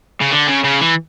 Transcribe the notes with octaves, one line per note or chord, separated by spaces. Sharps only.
C#3
D3
C#3
C#3
E3